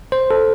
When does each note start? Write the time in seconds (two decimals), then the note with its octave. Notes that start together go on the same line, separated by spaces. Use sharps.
0.12 C5
0.31 A4